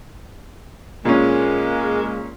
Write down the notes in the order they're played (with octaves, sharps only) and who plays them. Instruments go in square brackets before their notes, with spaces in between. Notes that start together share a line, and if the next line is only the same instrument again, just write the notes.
[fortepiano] A#2 C#4 [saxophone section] G#3 A#3